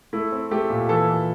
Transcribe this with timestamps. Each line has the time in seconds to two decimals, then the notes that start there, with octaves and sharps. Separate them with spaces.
0.13 A3 E4
0.32 C4
0.51 A3 G4
0.70 A#2
0.89 E3 A4
1.08 E3